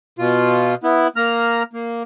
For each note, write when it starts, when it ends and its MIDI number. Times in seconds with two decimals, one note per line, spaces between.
0.19 0.75 47
0.19 0.75 65
0.84 1.08 59
0.84 1.08 64
1.16 1.63 58
1.16 1.63 82
1.16 1.63 89
1.73 2.03 58